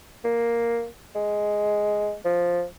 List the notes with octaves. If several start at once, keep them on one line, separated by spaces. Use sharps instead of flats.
A#3
G#3
F3